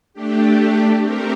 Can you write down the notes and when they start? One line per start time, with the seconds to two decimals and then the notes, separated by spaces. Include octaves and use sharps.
0.14 A3 D4 G4
1.02 A3 C4 G4 A#4